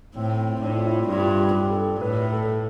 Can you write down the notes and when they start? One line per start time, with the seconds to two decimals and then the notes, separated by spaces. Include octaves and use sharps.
0.16 A2 C4
0.39 C4
0.53 C4
0.62 A2 D4
0.77 F4
0.85 E4
1.01 G4
1.08 G2 F4
1.40 G4
1.55 G2
1.70 A4
2.01 A2 B4
2.32 A4